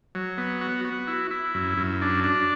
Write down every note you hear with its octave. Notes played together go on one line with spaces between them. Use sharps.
F#3
B3
F#4
F#4
E4
E4
F#2
F#2
D4
D4